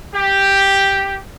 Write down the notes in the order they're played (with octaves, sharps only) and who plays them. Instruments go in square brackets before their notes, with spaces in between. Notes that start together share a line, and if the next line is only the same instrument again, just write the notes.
[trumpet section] G4